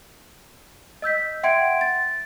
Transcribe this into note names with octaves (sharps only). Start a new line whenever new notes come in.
D#5 E6 G6 B6
E5 F#5 G5 C6 G#6 D7
A6